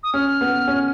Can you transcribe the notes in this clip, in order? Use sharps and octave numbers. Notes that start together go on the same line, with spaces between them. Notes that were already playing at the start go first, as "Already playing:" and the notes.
D#6
C#4 F6
B3
C#4